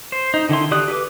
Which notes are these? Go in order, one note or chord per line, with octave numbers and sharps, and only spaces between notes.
C5
D#4
D3 D#3 E4 C6
D3 G4 D5 D#6 F#6
G4 A4 B4 D6